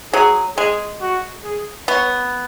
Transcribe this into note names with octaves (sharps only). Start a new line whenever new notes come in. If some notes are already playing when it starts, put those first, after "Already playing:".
F#3 G#4
G#3 G#4
F#4
G#4
B3 C#5